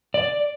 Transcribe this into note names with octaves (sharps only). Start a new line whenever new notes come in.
D5